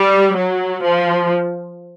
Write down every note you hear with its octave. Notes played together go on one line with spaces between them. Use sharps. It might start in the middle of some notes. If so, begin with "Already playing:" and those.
Already playing: G3
F#3
F3